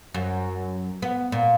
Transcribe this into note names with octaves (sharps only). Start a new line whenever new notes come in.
F#2
B3
A#2